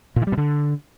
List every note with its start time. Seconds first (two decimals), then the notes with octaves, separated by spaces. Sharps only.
0.16 A#2
0.22 E3
0.27 G3
0.32 B2
0.37 D3